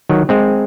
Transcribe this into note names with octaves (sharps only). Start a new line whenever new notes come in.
D#3 F#3
G#3 C4